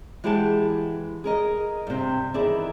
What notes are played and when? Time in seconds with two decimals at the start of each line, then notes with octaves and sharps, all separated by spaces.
0.24 E3 G#3 G4 G#4 F#5 A5
1.24 G#4 A#4 D#5
1.87 G2 C3
2.34 D#3 E3 B3 G#4 D5 E5